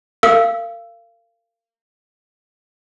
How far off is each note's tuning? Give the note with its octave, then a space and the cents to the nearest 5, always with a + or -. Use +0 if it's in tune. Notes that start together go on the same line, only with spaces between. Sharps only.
A#4 -40 F5 -25 E6 +0